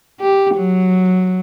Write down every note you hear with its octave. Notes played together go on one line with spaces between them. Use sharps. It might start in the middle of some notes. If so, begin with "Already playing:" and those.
G4
F#3